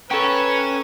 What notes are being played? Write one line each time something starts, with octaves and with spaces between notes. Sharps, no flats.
C#4 A4 B4 G5 A#5 C#6